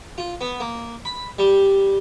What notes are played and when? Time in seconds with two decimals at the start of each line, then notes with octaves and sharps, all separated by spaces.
0.18 F4
0.41 B3
0.60 A#3
1.05 B5
1.39 G3